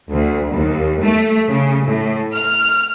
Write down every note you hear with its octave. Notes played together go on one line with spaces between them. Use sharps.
D2
D#2
A3
C#3
A2
F6